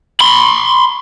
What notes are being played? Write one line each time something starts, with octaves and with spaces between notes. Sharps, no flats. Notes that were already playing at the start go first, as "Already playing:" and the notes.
B5 C6